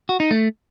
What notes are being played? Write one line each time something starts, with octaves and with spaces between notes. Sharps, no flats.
F#4
D#4
A3